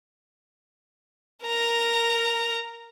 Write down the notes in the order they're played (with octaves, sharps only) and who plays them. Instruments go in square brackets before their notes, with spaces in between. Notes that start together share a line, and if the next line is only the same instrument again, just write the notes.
[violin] A#4 A#5